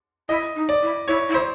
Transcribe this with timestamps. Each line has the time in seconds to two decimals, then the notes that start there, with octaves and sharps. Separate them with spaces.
0.28 E4 D#5
0.55 D#4
0.69 D5
0.82 E4
1.07 E4 C#5
1.28 E4
1.34 C5